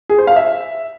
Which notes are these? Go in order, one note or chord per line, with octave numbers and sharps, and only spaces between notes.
G#4
C5
F5
E5